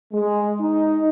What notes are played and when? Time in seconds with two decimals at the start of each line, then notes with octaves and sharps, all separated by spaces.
0.13 G#3
0.60 D#4